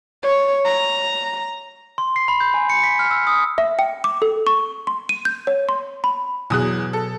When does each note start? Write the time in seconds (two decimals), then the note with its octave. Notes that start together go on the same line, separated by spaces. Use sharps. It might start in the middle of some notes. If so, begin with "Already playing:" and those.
0.23 C#5
0.65 A#5
1.98 C6
2.16 C7
2.28 B5
2.40 G6
2.54 G#5
2.70 C#7
2.83 B6
2.99 F6
3.11 E6
3.27 D#6
3.58 E5
3.79 G5
4.04 D6
4.22 A4
4.47 C#6
4.87 C6
5.09 D#7
5.25 G6
5.47 C#5
5.69 C6
6.04 B5
6.50 E2 B2 F#3 G#4 D#6 F#6
6.93 A4